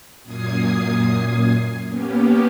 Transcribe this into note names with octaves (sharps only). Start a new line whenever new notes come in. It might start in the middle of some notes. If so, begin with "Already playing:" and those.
F#2 A#2 D#6 G#6 C7
A#3 B3 C#4 G4